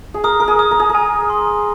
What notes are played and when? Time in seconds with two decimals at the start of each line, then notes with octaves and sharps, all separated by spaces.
0.14 G#4
0.24 A#4 D#6
0.40 A#4
0.48 G#4
0.59 D#6
0.71 A#4
0.80 G#4
0.90 A#4
0.95 G#5
1.30 C6